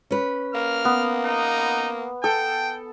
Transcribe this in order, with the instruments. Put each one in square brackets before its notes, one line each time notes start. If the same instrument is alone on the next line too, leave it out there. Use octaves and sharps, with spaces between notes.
[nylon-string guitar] C#4 B4
[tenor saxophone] A#3 [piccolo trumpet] F6
[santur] B3
[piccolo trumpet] D#4
[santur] A4 [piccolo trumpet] G5